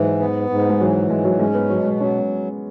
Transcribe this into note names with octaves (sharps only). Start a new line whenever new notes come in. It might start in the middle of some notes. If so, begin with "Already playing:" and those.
Already playing: G#2 E3 F#3
B3
G#2
G#3
E3 F#3
G#2 G#3
F#3
G#3 C#4
B3
B2 F#3
G#3
F#3 C#4